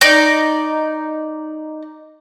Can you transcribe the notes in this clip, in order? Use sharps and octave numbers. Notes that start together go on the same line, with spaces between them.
D#4 D5